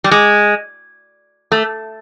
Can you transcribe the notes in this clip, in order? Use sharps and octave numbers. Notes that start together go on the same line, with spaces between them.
G3
G#3
A3